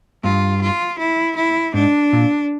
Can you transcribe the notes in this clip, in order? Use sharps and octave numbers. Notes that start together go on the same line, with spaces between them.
G2 F4
F4
E4
E4
G#2 D4
A#2